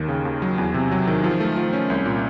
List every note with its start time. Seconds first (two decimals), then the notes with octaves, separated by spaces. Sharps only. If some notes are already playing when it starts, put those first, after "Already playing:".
Already playing: D#2 D#3
0.08 C#3
0.25 D#2
0.42 F#3
0.58 E2
0.74 C3
0.91 F#3
1.08 D#3
1.24 F3
1.40 A3
1.57 F3
1.73 C#4
1.90 C2
2.06 A#2